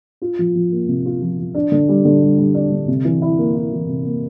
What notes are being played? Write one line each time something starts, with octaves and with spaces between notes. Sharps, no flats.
F4
F3
F3
A#3
C3
F4
F3
F3
D4
D3
G3
D3
G3
G3
D4
D3
C3
E3
E4
A#3
E4
E3
C3
A#3